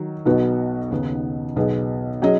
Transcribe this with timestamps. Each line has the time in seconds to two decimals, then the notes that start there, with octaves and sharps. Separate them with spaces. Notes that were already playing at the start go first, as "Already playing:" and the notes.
Already playing: D#3 F#3
0.26 B1 B2 B3 F#4
0.91 D#2 C#3 B3
1.56 B1 B2 B3 G#4
2.22 F#3 C#4 G#4 D#5